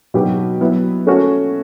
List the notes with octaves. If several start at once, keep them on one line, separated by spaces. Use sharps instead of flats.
B2 F#3 B3 D#4 G4
F#3 B3 E4
A3 C#4 F#4